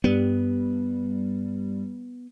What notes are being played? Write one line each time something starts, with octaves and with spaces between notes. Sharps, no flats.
G2 G3 B3